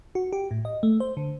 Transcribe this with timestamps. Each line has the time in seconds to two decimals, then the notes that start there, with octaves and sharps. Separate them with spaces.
0.15 F#4
0.33 G4
0.51 A2
0.65 D#5
0.83 A3
1.00 C5
1.17 D3